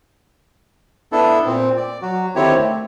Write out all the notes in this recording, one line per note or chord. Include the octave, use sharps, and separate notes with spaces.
B3 D4 E4 A4
A#2 C4
D5
F#3 F#4
D3 D#3 C4 E4 G4 C#5
A3